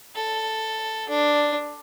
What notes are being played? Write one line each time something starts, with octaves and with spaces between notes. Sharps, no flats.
A4
D4